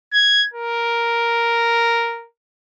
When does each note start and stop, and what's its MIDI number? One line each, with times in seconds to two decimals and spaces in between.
0.13 0.44 92
0.54 2.27 70